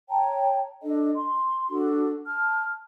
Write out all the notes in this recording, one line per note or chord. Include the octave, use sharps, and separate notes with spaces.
C#5 G5 A5 A#5
D4 A4 D#5
C6
D4 F#4 A4
A5 F6